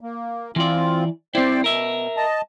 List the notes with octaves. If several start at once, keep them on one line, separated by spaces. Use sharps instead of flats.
A#3
E3 C4 F4 D5
C4 E4 C5 D5 G5
B2 A#4 E5
D#5 A5